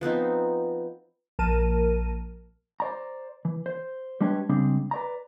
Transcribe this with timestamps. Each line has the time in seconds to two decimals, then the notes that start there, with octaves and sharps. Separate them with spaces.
0.01 F3 B3 C4 D#4
1.39 A#1 A#4 A5 D#7
2.80 C5 D5 A#5
3.45 E3
3.66 C5
4.21 G3 G#3 D4 G4 B4 C#5
4.49 C#3 G3 G#3 C4 D4
4.91 B4 D5 A#5